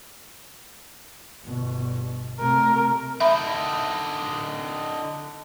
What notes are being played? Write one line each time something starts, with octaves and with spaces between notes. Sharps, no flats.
G1 B2
C3 A3 A#4
D3 D#4 E5 B5